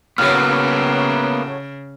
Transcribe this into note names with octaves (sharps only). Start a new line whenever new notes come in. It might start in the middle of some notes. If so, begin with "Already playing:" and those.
A2 C#3 F#3 A#3 B3 F6